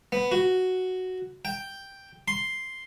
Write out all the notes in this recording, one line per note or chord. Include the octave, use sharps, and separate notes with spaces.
B3
F#4
G5
C6